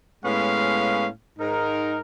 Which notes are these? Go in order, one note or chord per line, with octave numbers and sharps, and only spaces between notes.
A2 G#3 B3 C#4 F5
G#2 D#4 A#4